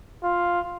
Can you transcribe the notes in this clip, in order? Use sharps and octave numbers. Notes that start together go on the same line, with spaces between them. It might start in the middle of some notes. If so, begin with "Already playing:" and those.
F4